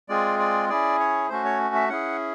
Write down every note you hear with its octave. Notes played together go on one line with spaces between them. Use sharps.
G#3 C4 F4 G#4 D5
D5
C#4 E4 G#4 D5
C#5
A3 C#4 F#4 C5
C#5
E5
C#4 E4 G#4 F#5